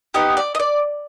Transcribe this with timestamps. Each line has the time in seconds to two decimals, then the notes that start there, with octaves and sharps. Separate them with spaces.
0.14 B3 D#4 G4 D#5
0.37 D5
0.55 D#5
0.60 D5